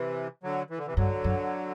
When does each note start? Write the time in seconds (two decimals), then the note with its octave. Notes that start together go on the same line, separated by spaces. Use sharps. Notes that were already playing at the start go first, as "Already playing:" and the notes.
Already playing: C3 E3
0.43 D3 F#3
0.70 E3
0.78 D3
0.87 C3 E3
0.96 G2 D3 F#3
1.24 F#2